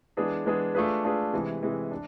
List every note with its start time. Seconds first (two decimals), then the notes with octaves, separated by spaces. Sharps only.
0.17 E3 G#3 B3 D4 G#4
0.46 E3 G#3 B3 D4 G#4
0.75 A3 D4 F4 G#4 B4
1.04 A3 D4 F4 G#4 B4
1.33 C3 E3 G#3
1.62 C3 E3 G#3
1.91 D4